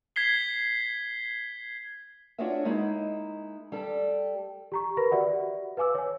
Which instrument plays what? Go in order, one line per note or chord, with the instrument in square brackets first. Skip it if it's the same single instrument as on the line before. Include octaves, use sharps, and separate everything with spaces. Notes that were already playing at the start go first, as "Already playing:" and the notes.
[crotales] G#6 B6 C7 G7
[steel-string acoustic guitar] D4 F4 F#4 G#4 C#5 E5
G#3 A#3 D#4 E4
G3 G4 A4
[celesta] G4 A#5 C#6
A#4 B4 B5 A#6
F#4 G4 D5 E5 F#5
B4 F5 G#5 D6 E6
C#5 G#5